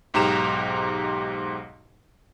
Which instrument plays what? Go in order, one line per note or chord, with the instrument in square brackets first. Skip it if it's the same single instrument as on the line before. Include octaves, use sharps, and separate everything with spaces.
[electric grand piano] B1 G#2 G4 A#5 E7